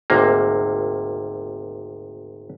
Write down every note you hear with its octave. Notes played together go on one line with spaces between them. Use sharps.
G#1 D2 C3 A#3